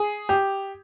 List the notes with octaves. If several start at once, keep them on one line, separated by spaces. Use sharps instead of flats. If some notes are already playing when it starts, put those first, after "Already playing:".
Already playing: G#4
G4